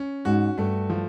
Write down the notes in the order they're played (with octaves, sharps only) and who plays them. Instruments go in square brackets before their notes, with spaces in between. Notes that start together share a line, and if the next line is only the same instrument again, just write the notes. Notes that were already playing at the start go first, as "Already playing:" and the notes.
Already playing: [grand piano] C#4
[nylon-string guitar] G#2 [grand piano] F#4
[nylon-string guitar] G2 [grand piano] A3
[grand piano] F3